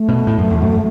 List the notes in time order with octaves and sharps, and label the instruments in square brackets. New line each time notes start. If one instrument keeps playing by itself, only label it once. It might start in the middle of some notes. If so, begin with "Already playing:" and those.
Already playing: [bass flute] A3
[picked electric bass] B2
A2
F#2
E2
F#2